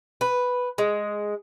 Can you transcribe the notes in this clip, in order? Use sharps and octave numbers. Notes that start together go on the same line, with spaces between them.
B4
G#3